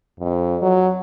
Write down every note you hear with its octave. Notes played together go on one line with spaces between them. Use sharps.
F2
F#3